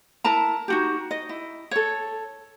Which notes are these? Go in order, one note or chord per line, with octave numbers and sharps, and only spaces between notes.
E4 A#4 A5 A#5
D#4 F#4 G4
D#5
E4
A4 C#5